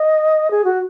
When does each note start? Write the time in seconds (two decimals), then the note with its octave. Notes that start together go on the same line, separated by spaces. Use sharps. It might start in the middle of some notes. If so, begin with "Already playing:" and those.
Already playing: D#5
0.51 G#4
0.64 F#4